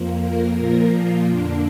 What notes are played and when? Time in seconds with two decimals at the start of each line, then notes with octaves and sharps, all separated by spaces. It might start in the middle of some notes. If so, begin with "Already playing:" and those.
Already playing: F2 F3 A#3
0.21 A#4
0.58 A#2 F3 A#3 A#4
0.94 F4
1.30 F2 D3 A#3 D4